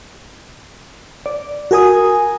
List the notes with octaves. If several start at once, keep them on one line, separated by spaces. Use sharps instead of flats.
D5
F#4 A#4 G#5 D#6